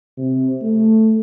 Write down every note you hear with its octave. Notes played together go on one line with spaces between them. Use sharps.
C3
A3